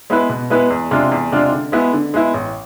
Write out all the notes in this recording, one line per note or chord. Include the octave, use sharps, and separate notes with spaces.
G#3 B3 E4 B4
B2
G#3 B3 E4 B4
E2
C3 G#3 D4 F4
E2
C3 G#3 D4 F4
D3
G#3 B3 E4
D3
G#3 B3 E4
A1